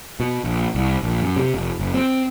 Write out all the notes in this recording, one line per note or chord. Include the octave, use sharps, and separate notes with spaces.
B2
A#1
C2
A#1
F#2
C3
F1
F#1
C4